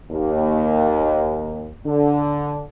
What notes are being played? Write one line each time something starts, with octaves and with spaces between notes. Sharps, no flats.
D#2
D3